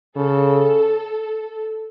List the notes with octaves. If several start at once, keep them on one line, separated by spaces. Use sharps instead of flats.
C#3 A4